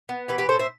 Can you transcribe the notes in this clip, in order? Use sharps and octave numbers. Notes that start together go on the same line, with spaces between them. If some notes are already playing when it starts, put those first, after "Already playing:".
B3
E3 G4 B4
G4 B4
A2 A4 C5
C5 E5